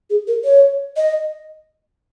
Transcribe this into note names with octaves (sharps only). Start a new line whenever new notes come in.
G#4
A#4
C#5
D#5